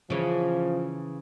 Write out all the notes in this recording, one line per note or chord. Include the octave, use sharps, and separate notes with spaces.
C#3 E3 F3